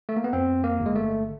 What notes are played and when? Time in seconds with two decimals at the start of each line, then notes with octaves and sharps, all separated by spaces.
0.09 A3
0.17 A#3
0.24 B3
0.33 F2 C4
0.64 A#3
0.79 G1
0.86 G#3
0.96 A3